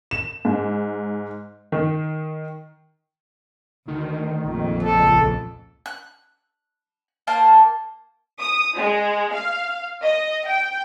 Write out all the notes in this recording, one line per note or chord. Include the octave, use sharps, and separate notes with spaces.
E7
G#2
D#3
D2 D#3
A#1 F2
C#2 A4
F#6
A#3 C5 F5 A5
D#6
G#3
F5
D#5
G5